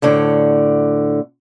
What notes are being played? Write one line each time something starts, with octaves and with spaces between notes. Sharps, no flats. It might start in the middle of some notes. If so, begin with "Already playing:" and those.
D2 A2 D3